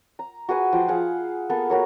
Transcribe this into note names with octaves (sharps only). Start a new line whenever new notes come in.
A#5
F#4 G#4 B4 G#5
F3 G5 C6
G#4 F5 F#5
A#3 B3 G#4 A4
F#4 A#4 C#5